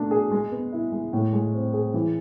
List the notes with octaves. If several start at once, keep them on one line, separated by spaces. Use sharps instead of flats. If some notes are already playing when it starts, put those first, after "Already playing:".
Already playing: B2 A3 D4
G#4
G#3
B3
E4
G#3
A2
G#3
C4
G#4
E3